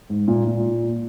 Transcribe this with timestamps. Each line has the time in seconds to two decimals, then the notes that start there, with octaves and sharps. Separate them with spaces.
0.10 G#2
0.28 A#2
0.47 A#2